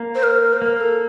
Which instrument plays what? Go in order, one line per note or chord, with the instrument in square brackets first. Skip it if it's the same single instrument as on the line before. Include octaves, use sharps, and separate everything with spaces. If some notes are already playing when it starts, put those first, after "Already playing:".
Already playing: [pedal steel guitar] A#3
[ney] C5
A#4
A#4
C5
[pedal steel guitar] A#3 [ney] A#4
[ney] A4